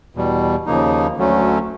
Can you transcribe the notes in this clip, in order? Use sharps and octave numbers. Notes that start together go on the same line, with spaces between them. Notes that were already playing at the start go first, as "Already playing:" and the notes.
E2 B2 G3
D#2 C#3 F3 A#3 D#4
D2 D3 F#3 A3 C#4